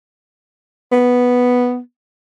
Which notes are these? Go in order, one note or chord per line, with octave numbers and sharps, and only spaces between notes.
B3